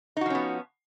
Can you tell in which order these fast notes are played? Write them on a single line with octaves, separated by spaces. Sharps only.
D#4 F#4 F3 C#4 B3